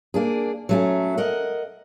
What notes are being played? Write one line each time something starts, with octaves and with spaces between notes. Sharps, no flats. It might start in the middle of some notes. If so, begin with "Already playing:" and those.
A#3 D4 G#4
F#3 A3 C#4
A#4 D#5 F#5